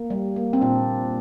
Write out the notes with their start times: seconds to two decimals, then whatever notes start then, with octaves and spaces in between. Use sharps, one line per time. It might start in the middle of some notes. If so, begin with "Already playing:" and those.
Already playing: A#3
0.10 G3
0.36 A#3
0.53 C4
0.61 A#2 D4